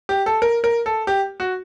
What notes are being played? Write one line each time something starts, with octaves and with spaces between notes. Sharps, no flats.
G4
A4
A#4
A#4
A4
G4
F#4